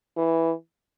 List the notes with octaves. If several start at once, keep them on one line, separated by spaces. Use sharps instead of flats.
E3